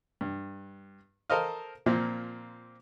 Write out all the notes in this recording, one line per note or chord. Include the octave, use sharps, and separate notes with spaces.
G2
A4 A#4 C5 D#5 F5
A#2 F3 A#3 C4